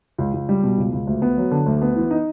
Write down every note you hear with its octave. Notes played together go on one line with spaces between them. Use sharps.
C#2
C#2
G3
B2
C#2
C#2
D2
B3
F#3
D3
D2
B3
E3
D#4